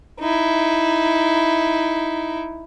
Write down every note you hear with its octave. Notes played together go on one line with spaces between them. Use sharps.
D#4 E4